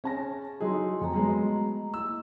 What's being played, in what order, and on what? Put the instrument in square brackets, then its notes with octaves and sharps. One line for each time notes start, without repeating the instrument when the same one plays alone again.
[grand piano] C#4 A5 A#6 [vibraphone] G#4
[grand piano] F#3 D#4 G#4 [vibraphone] E4 F#4 C6
[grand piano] F2 [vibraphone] A3 D#5 A#5
[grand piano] F#3 G#3 B3
[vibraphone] A#3 E4 [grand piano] E6